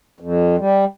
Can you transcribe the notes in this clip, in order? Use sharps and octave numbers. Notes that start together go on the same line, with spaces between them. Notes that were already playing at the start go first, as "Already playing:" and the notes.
F2
G3